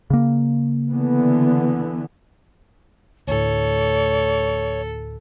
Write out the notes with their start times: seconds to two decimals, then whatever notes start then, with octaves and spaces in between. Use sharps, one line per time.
0.10 C#3 A#3
0.90 D3 E3 B3
3.28 D2 A2 A4 C#5